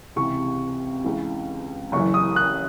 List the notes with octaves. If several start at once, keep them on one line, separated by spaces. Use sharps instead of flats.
C#2 C3 E3 C#6
C#2 C#3 E3
F#1 F#2 E3 C#6
D#6
F#6